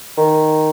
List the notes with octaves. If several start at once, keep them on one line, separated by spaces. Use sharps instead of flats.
D#3